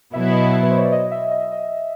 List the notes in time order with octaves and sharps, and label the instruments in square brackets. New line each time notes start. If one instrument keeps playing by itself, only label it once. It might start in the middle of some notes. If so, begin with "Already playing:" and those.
[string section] B2 F#3 B3 E4 [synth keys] E5
[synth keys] D#5
E5
B4
C5
C#5
D5
D#5
E5
D#5
D#5